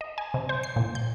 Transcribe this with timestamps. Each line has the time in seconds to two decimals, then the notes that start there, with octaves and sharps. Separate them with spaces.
0.01 D#5
0.18 G#5
0.34 C3
0.49 C5
0.63 C7
0.76 A#2
0.95 G6